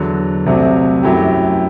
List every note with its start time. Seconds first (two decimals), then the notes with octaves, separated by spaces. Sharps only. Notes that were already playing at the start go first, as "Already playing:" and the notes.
Already playing: E2 D3 F#3
0.46 C2 C3 F#3 A3 C4
1.03 F#2 F#3 A3 E4 G4